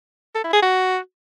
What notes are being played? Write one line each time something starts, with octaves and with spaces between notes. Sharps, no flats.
A4
E4
G#4
F#4